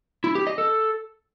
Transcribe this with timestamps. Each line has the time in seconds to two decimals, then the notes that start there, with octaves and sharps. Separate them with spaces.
0.24 E4
0.35 G4
0.47 D#5
0.58 A4